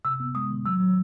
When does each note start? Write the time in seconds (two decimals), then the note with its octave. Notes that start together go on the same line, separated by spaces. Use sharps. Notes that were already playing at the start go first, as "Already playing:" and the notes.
0.05 C3 E6
0.20 B3
0.35 G#3 D#6
0.51 D#3
0.65 F#3 E6
0.80 F#3